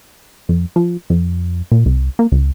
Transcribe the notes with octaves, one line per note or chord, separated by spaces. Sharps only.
F2
F3
F2
A#2
C2
A#3
C#2